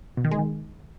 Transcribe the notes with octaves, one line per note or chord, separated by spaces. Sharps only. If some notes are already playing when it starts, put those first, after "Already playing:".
B2
D#3
G#3
D#3